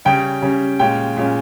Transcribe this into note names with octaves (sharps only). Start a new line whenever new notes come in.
C#3 G3 C#4 G5
C#3 G3 C#4
A#2 G#3 C#4 F4 G5
A#2 G#3 C#4 F4